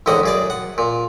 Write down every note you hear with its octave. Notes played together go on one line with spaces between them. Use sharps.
A1 D#2 G#2 D3 D#5 F#5
F#2 G#4 D5
F#5
A#2